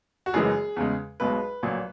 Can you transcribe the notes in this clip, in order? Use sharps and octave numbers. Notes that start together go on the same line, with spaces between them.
F#4
F#1 F#2 E3 G#3 G#4
E2 C#3 G#3
B1 B2 G#3 B4
A#1 A#2 F#3